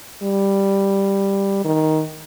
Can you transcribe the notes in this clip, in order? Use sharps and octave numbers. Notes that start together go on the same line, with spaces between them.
G3
D#3